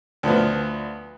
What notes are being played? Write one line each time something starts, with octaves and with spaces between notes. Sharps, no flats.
D2 F3 B3